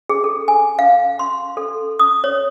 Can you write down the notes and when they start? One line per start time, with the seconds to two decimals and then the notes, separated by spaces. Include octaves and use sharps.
0.09 G#4
0.24 A4
0.48 G#5
0.79 F5
1.19 C6
1.57 A4
1.99 D#6
2.24 C#5